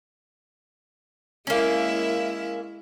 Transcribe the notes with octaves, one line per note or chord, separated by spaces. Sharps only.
G#3 A#3 C#4 E4